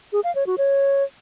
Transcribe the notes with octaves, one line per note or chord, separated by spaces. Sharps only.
G#4
F5
C#5
F#4
C#5